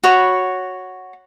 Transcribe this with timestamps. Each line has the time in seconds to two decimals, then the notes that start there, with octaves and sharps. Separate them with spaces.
0.04 F#4 C#5 B5